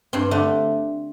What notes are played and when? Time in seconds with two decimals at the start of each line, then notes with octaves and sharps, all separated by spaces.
0.13 G2 C4
0.31 D3 A3